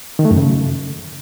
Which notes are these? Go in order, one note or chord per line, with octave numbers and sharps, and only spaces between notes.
D#3
A3
F#2
C#3